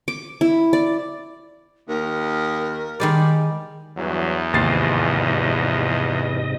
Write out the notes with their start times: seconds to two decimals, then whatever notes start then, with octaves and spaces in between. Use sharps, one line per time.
0.08 D6
0.41 E4
0.73 D5
1.88 D#2 A#4
3.00 D#3 G3 G#3 D5
3.97 E2 G2 E3 F#3
4.54 D#2 G#2 C3 F3 G#3 D#5 A6 C7